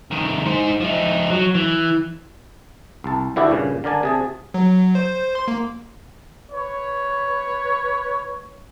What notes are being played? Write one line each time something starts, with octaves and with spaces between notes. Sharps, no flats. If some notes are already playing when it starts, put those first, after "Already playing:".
C2 D#3
D#4 C5
F3 D#4
F#3
E3
C2 A5
D3 E3 E4 F#4 G4 D5
G2 A#2 C#3
D3 A#4 D5 G#5 A5
C3 G#4 A5
F#3
C5
C6
A#3
B4 C#5